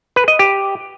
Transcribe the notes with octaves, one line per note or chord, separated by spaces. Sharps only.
B4
D#5
G4